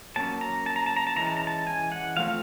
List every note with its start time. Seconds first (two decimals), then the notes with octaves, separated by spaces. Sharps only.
0.16 F#3 A#3 C#4 A5
0.41 A#5
0.66 A5
0.76 A#5
0.86 A5
0.96 A#5
1.07 A5
1.16 E3 G#3 C#4 A#5
1.27 A5
1.37 A#5
1.47 A5
1.67 G#5
1.92 F#5
2.17 F3 A3 C4 F5